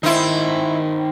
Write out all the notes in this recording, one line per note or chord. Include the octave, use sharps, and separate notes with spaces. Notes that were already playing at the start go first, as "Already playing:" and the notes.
D#3 D#4 E4 C5